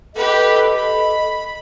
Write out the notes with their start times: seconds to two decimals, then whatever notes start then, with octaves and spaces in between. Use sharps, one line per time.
0.15 G4 A4 B4 D#5
0.75 B5